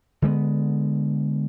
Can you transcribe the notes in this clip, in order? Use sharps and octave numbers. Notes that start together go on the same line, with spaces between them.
D3 G#3 A3 B3